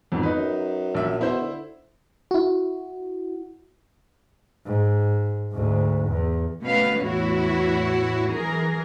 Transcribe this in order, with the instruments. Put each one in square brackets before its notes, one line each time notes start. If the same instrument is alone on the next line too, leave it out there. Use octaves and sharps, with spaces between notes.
[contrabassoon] B1 [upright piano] F2 G#2
[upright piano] D#4 B4
[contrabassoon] F#2
[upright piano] A#1 E5
[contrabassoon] B2 [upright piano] E4 C5 E5
[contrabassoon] D3
[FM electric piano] E4 F#4
[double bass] G#2
D2 G#2
E2
[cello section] B2 A3 C#4 B4 F5
E2 A2 E4 F#4 C#5
E3 F#3 G#4 A#4